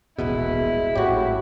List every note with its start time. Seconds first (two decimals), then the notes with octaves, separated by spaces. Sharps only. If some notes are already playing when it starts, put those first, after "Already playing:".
0.18 D#1 A1 B2 G#3 E4
0.95 G#1 A2 F#3 F#4 G4